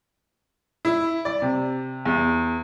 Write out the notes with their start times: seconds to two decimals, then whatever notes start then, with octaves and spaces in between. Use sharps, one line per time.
0.85 E4
1.25 D5
1.42 C3
2.05 E2